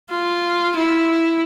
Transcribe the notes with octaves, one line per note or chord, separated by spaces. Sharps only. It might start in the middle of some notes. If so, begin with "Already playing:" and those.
F4
E4